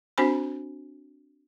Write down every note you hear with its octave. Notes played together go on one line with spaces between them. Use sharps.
C4 D4 F#4 C5 G#5 B5